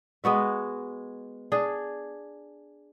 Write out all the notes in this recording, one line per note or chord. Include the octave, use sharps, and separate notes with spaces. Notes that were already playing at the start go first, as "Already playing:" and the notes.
G#3 B3 F#4 E5
D4 G#4